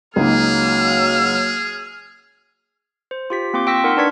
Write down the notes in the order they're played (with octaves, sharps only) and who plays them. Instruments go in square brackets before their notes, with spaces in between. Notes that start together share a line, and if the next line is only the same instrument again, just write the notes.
[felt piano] C#2 D#4 [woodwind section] F#3 A#3 [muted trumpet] G#4 [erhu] F6
[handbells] C5
F4 G4 B6
A#3 C4 F4 C6 D6
G5 C#6 E6 A#6 B6
D#4 A#4 F#5 C6
D4 B4 D5 C#6 G#6 B6